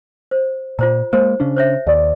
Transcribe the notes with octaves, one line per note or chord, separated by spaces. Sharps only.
C5
A#2 F4 C5 A#5
G#3 A#3 C5
C#3 C#4 D4
C5 C#5 E5
D#2 D5